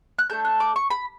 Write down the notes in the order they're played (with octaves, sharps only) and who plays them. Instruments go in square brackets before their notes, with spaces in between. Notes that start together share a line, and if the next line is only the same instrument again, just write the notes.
[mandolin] F#6
A3 D4 A4 G6
F#6
D6
C#6
B5